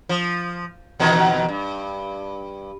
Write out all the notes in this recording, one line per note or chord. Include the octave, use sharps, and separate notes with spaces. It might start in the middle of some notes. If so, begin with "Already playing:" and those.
F3
E2 B2 D#3
G2